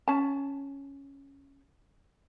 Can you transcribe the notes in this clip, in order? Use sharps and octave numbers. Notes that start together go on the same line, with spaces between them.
C#4 A5